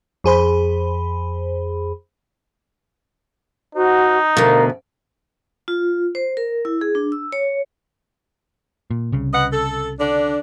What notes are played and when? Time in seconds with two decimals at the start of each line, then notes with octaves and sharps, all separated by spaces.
0.24 F2 G#4 C5 B5
3.75 D#4 F#4 C5
4.37 D2 B2 A#4 F5 A#5
5.68 F4
6.15 C5
6.37 A#4
6.65 E4
6.81 G#4
6.95 D4
7.12 E6
7.32 C#5
8.91 A#2
9.12 C2 C#3
9.33 B4 D#5 F#5
9.51 A4
9.99 D3 D4